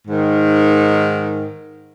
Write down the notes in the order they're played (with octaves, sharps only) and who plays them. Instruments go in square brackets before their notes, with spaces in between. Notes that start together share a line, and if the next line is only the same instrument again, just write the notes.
[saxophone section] G#2 D#3